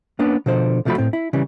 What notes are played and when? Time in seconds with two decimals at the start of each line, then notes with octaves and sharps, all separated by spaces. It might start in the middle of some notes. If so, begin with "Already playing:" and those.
0.19 A#3 B3 C#4 D4
0.46 B2 D3 F3 C5
0.85 B1 C3 F3 A3 F#4 B5
0.98 A2 C4
1.13 E4
1.33 C#3 E3 G3